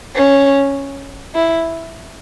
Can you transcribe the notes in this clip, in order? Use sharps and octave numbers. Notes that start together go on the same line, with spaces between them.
C#4
E4